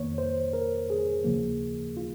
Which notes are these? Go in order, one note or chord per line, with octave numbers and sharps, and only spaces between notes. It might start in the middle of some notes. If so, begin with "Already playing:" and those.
Already playing: F2 D#3 A#3 C#5
C5
A#4
G#4
D#2 C#3 F3 A#3
F4